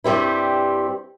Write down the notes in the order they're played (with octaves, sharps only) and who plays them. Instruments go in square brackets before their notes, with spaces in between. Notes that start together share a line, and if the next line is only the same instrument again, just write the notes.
[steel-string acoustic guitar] G2 G3 C4 E4